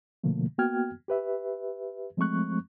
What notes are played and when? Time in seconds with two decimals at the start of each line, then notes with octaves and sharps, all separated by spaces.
0.24 B2 D3 F3 A3 A#3
0.58 A#3 B3 F#4 G5 F6 G#6
1.08 G4 B4 E5
2.17 F3 G#3 A3 C4 C#6 F#6